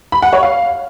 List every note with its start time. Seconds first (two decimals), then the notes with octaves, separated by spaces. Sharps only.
0.12 B5
0.22 F#5
0.33 C#5
0.43 F5